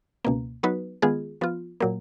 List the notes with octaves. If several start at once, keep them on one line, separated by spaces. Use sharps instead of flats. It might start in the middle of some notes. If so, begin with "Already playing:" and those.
C#2 B2 A#3
F#3 B3 D#4 F#4 B4
D#3 G#3 B3 F4 G#4
F3 B3 F4
A#2 F#3 A#3